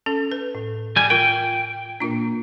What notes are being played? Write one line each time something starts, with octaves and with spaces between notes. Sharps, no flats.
C#4 A4
B4
A2
G3 G#5
F4 A#4 G5
A#2 A#3 D4 F4